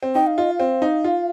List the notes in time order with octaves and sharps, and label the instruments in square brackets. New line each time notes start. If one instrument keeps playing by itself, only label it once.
[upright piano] C4
[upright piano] D#4 [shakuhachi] G5
[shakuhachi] F5
[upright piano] F4 [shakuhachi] D#5
[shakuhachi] F5
[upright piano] C4
D#4
F4